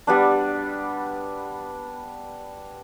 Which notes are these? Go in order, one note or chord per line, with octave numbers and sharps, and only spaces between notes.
G3 B3 D4